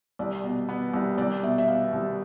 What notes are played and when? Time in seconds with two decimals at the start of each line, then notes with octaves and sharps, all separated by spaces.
0.19 C2 D5
0.44 B2
0.69 B3
0.94 C2
1.18 C2 D5
1.43 B2 E5
1.58 E5
1.68 B3 F5
1.93 C2